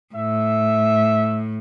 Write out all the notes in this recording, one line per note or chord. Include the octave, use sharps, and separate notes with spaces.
A2 E5